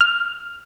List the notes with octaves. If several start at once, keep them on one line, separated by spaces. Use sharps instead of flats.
F6